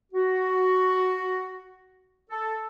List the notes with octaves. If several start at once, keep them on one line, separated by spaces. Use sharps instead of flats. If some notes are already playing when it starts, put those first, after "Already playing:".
F#4
A4